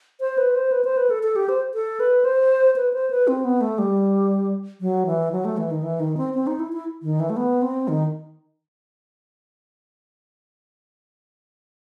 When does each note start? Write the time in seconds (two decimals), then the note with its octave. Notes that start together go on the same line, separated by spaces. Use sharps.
0.21 C5
0.38 B4
0.55 C5
0.72 B4
0.84 C5
0.97 B4
1.10 A4
1.23 A4
1.36 G4
1.49 C5
1.74 A4
2.00 B4
2.25 C5
2.76 B4
2.93 C5
3.10 B4
3.28 C4
3.45 B3
3.61 A3
3.78 G3
4.81 F#3
5.06 E3
5.32 F#3
5.45 A3
5.57 E3
5.71 D#3
5.83 E3
6.00 D#3
6.17 C4
6.34 C4
6.47 D#4
6.60 E4
6.72 E4
7.03 D#3
7.20 E3
7.30 A3
7.37 B3
7.62 C4
7.88 D#3